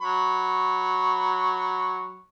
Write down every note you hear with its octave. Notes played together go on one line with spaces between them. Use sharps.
F#3 B5 C#6